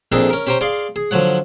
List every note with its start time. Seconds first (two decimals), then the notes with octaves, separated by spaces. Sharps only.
0.12 F2 A#2 D4 D#4 G#4 A4
0.30 C#4 A#4
0.47 C#4 G4 C5 G5 A#5 C#6
0.61 G#4 D5 F5 C6
0.96 G#4
1.11 D3 F3 F#3 C#5 F#5